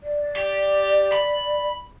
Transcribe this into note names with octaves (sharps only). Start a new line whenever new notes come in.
D5
G4
B5